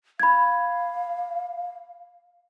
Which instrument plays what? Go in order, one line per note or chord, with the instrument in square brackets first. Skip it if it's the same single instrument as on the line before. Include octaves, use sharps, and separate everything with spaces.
[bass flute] F5 [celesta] B5 G#6